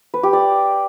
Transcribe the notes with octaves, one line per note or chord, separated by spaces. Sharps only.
B4
G4
D5